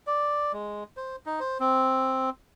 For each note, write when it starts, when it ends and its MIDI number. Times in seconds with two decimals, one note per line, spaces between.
0.07 0.52 74
0.53 0.84 56
0.97 1.16 72
1.26 1.40 63
1.40 1.58 72
1.60 2.30 60